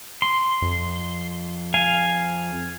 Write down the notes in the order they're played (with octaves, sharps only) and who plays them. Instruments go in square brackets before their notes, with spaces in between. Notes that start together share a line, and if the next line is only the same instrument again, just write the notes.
[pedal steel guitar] C6
[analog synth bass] F2
[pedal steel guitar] F5 G#5